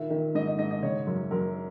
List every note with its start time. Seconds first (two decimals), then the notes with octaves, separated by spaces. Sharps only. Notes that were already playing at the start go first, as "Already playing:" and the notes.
Already playing: A#2 D#3 E5
0.10 D#3
0.35 G#2 D#5
0.47 D#5
0.59 G#2 D#5
0.71 D#5
0.83 C#3 C#5
1.07 F#2
1.31 F#2 A#4